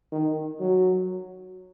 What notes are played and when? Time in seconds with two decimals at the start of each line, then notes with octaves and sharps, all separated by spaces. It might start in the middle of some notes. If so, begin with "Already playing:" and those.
0.12 D#3
0.60 F#3